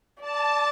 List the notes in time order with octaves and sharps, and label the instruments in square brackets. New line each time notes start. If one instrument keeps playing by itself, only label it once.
[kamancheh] D5 [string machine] A5